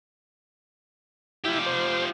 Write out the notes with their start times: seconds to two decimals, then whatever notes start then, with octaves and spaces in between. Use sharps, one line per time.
1.45 F3 E4 G4
1.66 C5